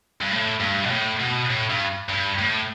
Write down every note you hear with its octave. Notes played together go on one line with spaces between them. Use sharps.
G2
A2
G2
B2
A2
B2
A2
G2
G2
A2